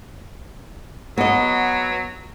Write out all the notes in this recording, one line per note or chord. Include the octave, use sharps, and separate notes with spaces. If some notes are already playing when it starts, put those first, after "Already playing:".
F#3 B3 D#5